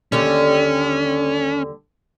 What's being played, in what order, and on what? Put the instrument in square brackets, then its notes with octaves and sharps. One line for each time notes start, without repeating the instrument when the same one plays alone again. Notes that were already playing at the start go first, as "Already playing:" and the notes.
[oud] D#2 D3 G3 [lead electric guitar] C#4